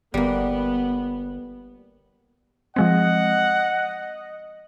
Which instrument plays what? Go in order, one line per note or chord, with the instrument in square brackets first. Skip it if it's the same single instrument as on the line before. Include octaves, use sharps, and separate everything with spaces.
[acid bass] G1 [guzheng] G3 A#3 [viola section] B3
[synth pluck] F3 G#3 C4 [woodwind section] D#5 [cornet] F#5